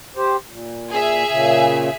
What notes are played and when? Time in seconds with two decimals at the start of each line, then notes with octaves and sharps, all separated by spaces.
0.16 G4 C5
0.50 A#2
0.91 G#4 E5
1.28 A#2 C#3